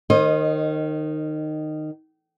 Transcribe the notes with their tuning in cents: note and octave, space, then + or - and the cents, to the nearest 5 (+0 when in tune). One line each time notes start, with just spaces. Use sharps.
D#3 -15 C5 +35 D#5 +0